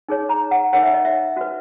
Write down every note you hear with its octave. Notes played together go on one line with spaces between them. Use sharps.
D#4 G#4 C#5
A#5
F#5
D#4 A#4 C#5 F#5
E5
D#5
E5
F#4 B4